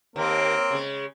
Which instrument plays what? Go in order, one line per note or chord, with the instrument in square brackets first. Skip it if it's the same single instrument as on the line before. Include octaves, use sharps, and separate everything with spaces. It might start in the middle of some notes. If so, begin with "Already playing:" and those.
[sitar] D#2 [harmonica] A#3 C4
[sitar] C#3 G#3